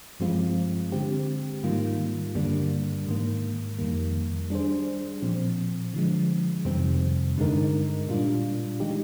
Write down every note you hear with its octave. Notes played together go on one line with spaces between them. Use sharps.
G2 F3 G#3 C4 F4
D3 G#3 C4 G4
G#2 D#3 G3 A#3 F4
G2 D3 G3 A#3 D4
G#2 D#3 A#3
F2 D#3 G3 A#3
G3 D4 G#4 C5
A#2 F3 C4
D3 F3 G#3
F2 C3 D#3 G3 C4
G2 D3 G#3 D#4 A#4
A#2 G3 D4 F4
D#3 G#3 D#4 G4